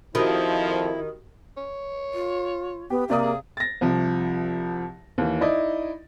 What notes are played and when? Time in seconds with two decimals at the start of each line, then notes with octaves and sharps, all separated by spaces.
0.15 F2 D#3 F3 E4 F#4 G4 B5
1.57 C#5
2.14 F4
2.90 B3 G4
3.10 C3 A#3 D5 F5 D#6
3.23 G#4
3.57 A6 A#6
3.81 C2 C3 F3
5.18 D#2 E3
5.41 D#4 E4 D5 D#5